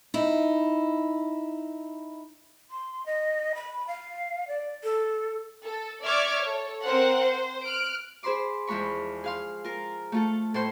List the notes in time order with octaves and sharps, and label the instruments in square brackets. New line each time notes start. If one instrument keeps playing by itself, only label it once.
[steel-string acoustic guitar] D#4 E4
[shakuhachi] C6
D#5
B5
F5
D5
A4
[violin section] A4
D5 E5 C#6 D6 F6 G#6
A4 C#5
C4 A#4 C5 F#5
C5
F6 F#6 D7
[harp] G#4 C5 B5 C6 D6
E2 F3 G#3 B5 C#6
G#4 F5 C6
F4 A#4
A3 F4 A4
A2 A4 C5 C6 G6